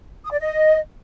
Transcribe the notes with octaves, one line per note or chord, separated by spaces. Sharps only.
D#6
D5
D#5